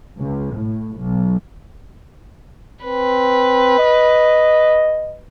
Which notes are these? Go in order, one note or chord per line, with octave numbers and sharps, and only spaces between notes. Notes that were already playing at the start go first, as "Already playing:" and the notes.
C#2
A2
B1
C4 B4
D#5